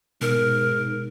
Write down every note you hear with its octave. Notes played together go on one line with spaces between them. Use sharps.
G#2 B2 A#4